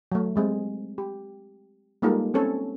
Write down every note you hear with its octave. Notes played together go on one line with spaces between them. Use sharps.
F#3 A3
G3 G#3 C4
G4
G3 G#3 A#3 D#4 F4 A4
C4 C#4 A4 C#5